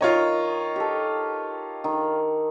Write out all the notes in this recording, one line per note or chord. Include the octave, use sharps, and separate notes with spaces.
D#3 F4 C#5 D#5
G4 A4
D#3